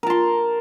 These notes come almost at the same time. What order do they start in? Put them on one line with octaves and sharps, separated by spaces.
A#4 A5 C6